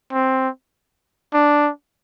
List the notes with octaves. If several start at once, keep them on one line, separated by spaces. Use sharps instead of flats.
C4
D4